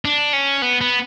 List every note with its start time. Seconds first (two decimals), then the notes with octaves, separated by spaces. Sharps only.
0.05 D4
0.33 C#4
0.62 B3
0.81 B3